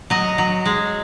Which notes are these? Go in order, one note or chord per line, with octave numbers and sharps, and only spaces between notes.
F#3 D#5
F#3
G#3